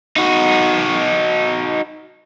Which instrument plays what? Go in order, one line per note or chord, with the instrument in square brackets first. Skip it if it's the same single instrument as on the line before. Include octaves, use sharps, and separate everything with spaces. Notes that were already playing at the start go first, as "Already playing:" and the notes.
[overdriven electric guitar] D#4 F#4